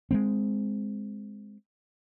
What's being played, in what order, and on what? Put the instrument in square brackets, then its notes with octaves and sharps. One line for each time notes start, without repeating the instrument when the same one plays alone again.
[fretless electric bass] G#3 A3 C4